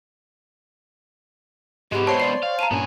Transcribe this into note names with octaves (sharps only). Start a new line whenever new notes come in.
G#2 G#3 B3 G4
C5 C#5 A5 C6
D5 C7
F5
A5 A#5 D#7
G2 A#2 B3 C#4 G#5